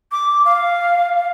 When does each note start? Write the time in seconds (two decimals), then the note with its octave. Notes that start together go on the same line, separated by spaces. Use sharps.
0.12 D6
0.45 F5